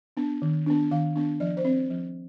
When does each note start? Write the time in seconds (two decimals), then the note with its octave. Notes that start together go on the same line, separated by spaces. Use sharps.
0.17 B3 D4
0.42 D#3
0.66 B3 D4
0.91 D#3 F5
1.15 B3 D4
1.40 F3 D5
1.57 C5
1.65 C4
1.90 F3